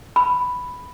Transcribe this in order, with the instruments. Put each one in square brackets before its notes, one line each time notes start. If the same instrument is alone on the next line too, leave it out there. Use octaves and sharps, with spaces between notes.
[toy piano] B5